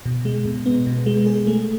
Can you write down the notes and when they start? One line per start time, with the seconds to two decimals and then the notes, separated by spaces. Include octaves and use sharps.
0.06 B2
0.25 G#3
0.46 B2
0.66 B3
0.87 B2
1.06 G#3
1.27 G#4
1.47 A3